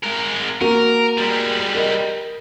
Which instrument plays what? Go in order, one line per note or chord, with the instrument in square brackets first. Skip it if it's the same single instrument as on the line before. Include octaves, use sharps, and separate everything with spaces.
[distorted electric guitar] G#3 A#4
[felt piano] A#3 F#4 D#7 [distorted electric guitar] A#4
[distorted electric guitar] G3 G#3
[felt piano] A#4 D#5